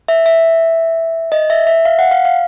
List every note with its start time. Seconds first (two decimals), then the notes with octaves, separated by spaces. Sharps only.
0.08 E5
0.26 E5
1.32 D#5
1.50 E5
1.67 E5
1.85 F5
1.99 F#5
2.11 F5
2.25 F5